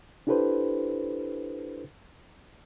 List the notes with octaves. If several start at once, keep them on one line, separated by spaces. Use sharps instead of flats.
D4 E4 G4 A4 B4 C5